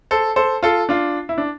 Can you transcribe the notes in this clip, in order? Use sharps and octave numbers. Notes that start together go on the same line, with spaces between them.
A4 C5
A4 C5
F4 A4
D4 F4
E4
D4